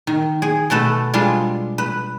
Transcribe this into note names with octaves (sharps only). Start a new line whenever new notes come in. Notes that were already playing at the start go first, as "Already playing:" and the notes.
D#3
G#4
B2 A3 A4 B4
G3 G#3 D4 F4
B4